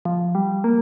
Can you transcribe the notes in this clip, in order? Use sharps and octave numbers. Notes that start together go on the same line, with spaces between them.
F3
G3
A#3